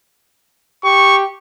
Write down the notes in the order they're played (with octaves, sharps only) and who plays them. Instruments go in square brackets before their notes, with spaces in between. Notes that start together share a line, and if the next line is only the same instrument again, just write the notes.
[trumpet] G4 [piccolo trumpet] C#6